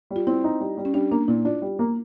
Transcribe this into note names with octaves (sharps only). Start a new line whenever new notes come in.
G3
F4
C4 E4
D#4
G3
G3
C#4
G3 D4
A#3 D4
A#2 E4
D4 F4
G3
A#3